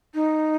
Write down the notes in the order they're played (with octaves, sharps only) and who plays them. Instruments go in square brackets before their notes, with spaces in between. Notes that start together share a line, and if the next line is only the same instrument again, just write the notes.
[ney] D#4